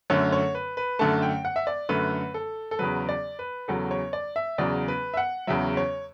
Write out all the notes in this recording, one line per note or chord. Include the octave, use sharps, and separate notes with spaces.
F#2 D3 A3 C#5
C#5
B4
B4
F#2 D3 A3 A5
G5
F#5
E5
D5
F#2 D3 A3 B4
A4
A4
E2 C#3 F#3 B4
D5
B4
E2 C#3 F#3 A4
C#5
D5
E5
E2 C#3 F#3 D5
B4
E5
F#5
E2 C#3 F#3 E5
C#5